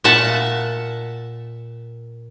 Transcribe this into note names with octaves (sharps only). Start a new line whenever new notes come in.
A#2 E5 F#5 A5